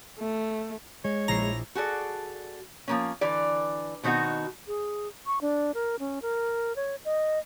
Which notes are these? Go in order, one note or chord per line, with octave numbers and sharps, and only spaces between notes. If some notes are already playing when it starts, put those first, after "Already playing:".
A3
G#3 C#5
A#1 E4 A#5 C7
F#4 G#4 A4 D5
F3 A#3 C#4
D3 E3 D5
B2 D#3 C4 D#4 F#4
G#4
C#6
D4
A#4
C#4
A#4
C#5
D#5